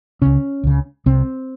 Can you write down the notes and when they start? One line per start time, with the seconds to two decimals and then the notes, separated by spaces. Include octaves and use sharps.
0.22 C#2 C#3 C#4
0.64 C#2 C#3
1.06 C2 C3 C4